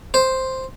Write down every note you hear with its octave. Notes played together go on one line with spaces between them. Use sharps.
C5